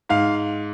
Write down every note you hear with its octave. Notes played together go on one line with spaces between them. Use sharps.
G#2 F5